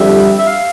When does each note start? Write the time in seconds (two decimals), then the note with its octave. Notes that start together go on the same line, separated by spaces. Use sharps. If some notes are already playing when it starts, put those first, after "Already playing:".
Already playing: F2 D3 G3 E5
0.38 E5
0.46 F5